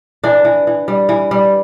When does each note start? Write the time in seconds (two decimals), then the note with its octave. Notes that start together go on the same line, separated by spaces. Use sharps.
0.24 E3 D4
0.45 E3
0.67 E3
0.88 G3
1.09 E3
1.31 G3